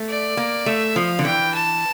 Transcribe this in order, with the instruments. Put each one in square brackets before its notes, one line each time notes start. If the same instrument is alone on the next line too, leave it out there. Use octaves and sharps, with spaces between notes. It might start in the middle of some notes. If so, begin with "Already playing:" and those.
Already playing: [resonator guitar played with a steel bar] A3
[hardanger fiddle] D5
[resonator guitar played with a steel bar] A#3
[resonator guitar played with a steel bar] A3 [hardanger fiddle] E5
[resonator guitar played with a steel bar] F3 [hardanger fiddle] F5
[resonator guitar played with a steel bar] D3
[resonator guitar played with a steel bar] E3 [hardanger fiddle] G5
[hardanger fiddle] A5